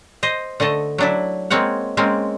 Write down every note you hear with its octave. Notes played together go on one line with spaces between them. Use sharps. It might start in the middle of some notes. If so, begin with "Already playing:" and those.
C5 D#5
D3 A3 D#5 A5
F#3 D4 E4
G#3 A#3 C4 C#5 F#5
G#3 A#3 C4 C#4